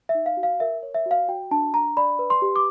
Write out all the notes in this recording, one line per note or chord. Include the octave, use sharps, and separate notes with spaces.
E5
D#4
F5
F#4
F5
A#4 E5
C#5
E5
F#4
F5
F#4 G5
D4 A5
D4 A#5
D5 B5
B4
C6
G4
D6